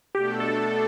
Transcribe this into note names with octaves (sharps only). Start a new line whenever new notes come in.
B2 A3 D4 G4 A4
A4